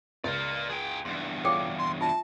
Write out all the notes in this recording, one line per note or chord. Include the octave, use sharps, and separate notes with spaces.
C#2 A#4 D5
G#4 G5
E2 G2 C6
D4 F4 G#4 A4 C#5 G5
C6
F4 E5 A5